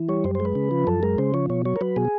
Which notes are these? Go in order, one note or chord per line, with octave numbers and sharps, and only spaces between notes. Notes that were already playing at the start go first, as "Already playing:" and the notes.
Already playing: E3
G3 C#5
F#2 C5
G#3 C5
B4
C#3
F3
F#2 A4
G#3 A#4
C#3 C5
F3 C#5
B2 C#5
F#3 C#5
A#4
F#3 B4
B2 G#4